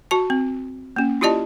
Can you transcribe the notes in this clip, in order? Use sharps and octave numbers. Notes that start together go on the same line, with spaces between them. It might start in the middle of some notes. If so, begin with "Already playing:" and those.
F#4 A5
C4
A#3 C#4
E4 F4 G4 D5 D#5 A5